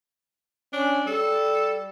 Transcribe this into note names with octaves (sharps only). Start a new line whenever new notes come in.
C#4 D4
G3 A4